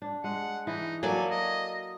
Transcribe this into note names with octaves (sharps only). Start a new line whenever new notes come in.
D4
G#3 F#5
E3 D#4
F#3 A#3 F#4 A4 B4 D5 G#5
D#5